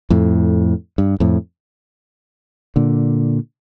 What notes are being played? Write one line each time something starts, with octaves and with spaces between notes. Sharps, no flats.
F2 A2
G2
F2 A2
A#2 D3